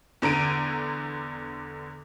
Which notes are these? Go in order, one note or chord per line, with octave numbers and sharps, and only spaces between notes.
E2 D3 A#5 D7 D#7